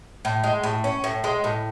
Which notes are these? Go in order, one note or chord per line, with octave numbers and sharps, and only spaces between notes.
A2
G#3
A2
C#4
A2
G#3
A2